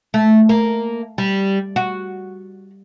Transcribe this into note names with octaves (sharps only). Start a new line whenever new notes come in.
A3
A#3
G3
F#4